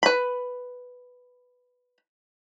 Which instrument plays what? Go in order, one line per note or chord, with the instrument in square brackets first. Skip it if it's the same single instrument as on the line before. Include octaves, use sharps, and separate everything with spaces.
[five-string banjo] B4 B5